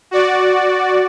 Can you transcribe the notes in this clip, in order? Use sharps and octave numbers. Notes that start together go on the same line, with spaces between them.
F#4 D5